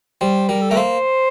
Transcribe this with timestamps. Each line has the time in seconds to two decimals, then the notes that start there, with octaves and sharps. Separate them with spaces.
0.21 G3 C5
0.49 G3 A#4
0.61 A4
0.69 A3 A#4
0.77 A#3 C5